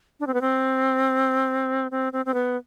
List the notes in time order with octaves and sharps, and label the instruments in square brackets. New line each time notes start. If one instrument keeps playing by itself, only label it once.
[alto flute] D4
C4
B3
C4
C4
C4
C4
B3